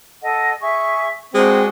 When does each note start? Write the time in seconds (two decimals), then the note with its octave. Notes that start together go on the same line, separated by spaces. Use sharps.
0.22 A4 D#5 F#5
0.60 G#4 E5 C#6
1.34 G#3 C4 D4 F#4 G#4